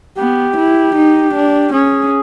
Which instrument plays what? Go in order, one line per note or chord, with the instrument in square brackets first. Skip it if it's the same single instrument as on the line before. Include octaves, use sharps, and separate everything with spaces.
[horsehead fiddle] B3 [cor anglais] G4
[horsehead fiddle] E4
D#4
D4
[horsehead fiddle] C#4 [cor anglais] G#4